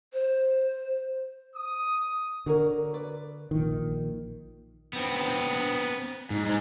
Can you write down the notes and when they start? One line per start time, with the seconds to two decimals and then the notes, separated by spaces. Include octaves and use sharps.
0.13 C5
1.56 D#6
2.46 D3 F#4 A#4 C#5
2.93 B4 D5
3.51 A#1 A#2 D#3
4.93 B3 C4
6.30 G#2
6.46 G#2 G#3